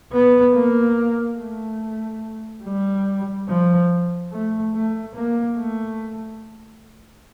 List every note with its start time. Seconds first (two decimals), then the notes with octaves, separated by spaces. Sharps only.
0.12 B3
0.54 A#3
1.38 A3
2.64 G3
3.48 F3
4.32 A3
4.75 A3
5.15 A#3
5.58 A3